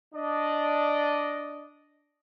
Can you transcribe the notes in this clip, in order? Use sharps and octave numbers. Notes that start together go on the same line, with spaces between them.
D4 D5 D#5